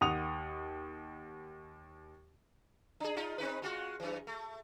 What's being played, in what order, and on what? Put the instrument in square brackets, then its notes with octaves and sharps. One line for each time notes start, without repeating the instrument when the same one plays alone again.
[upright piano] D#2 F#5 D#6 F7
[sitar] D4 G#4
D#4 F4
C4 D#4 B4
G#3 F4 F#4
F#2 E3
A3